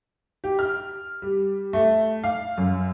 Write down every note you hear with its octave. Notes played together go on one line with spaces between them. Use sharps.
G4
F6
G3
A3
F5
F#2